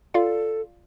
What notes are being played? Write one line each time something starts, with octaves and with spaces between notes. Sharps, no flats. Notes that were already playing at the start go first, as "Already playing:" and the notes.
F4 A4 D5 F5